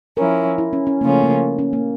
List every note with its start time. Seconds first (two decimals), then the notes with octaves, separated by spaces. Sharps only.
0.17 F3 C#4 E4 A#4
0.58 E4
0.73 C#4
0.87 C#4
1.01 C#3 F3 A3 A#3 C#4 F4
1.23 A#3
1.59 C#4
1.73 A#3